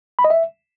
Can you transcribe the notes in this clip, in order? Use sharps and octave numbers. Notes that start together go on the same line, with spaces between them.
B5
D#5
E5